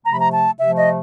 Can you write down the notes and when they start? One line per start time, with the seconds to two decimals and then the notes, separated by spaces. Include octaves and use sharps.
0.05 C3 F3 A3 A#5
0.13 B5
0.20 A#5
0.32 A5
0.59 C3 F3 A3 E5
0.77 D#5